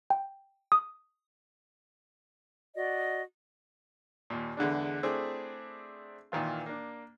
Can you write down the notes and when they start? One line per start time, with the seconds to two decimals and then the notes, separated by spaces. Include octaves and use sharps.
0.10 G5
0.72 D#6
2.76 F#4 D5 D#5
4.30 D#2 A#2
4.57 E2 D3 G#3 D4
5.03 A3 C4 D4 E4 G#4
6.32 A#2 D#3 E3 F4
6.66 A#3 D4